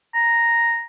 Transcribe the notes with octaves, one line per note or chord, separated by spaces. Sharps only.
A#5